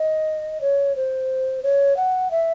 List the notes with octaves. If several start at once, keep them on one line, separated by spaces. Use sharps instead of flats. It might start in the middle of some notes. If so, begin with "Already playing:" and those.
Already playing: D#5
C#5
C5
C#5
F#5
E5